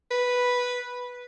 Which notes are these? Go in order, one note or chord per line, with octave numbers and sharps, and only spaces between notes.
B4